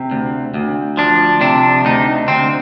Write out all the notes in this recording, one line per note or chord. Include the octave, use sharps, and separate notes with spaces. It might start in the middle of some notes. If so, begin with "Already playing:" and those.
Already playing: C3 C4
D2
D2
F3 D4
C3 D4
D2 D#4
D2 C4